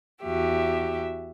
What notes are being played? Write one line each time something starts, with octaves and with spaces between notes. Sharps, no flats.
E2 F#4 G4 E5